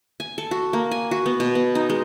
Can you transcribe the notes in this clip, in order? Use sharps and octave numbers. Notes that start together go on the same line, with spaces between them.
G#5
A4
F#4
A#3
G#5
F#4
B3
B2
B3
D#4
G#3